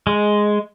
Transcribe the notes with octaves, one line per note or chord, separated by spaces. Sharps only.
G#3